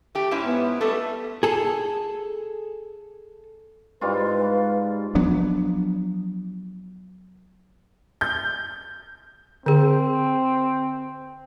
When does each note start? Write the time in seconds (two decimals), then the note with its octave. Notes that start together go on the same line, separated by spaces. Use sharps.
0.15 A3 G4
0.31 G#2 C#4 E4
0.44 B3
0.81 G3 A3 A4
1.43 G#4 A4
4.01 G#2 G3 F4 B4
5.15 F3 F#3 B3 D4
8.21 G6
9.66 D3 C4 G#4